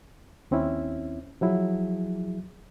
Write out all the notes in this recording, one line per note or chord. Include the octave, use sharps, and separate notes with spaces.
D#2 C4 C#4 E4
F3 F#3 E4 G#4